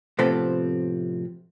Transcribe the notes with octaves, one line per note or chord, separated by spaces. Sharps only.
A2 C3 F3 B3 C4 A4